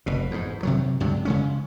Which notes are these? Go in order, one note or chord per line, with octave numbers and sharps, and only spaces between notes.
F1 B2
E2 G#2
C3 D#3 F#3
C#2 G2 C3 F#3
C#3 G#3 C#4